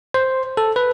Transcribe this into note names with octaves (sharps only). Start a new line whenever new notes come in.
C5
A4
B4